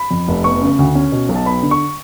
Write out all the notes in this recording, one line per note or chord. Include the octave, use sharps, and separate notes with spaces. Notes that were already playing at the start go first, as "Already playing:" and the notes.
Already playing: B5
F2
F1
B3 C#6
C#3
D2
C#4
B2
B1
A5
B3 B5
D3
C#6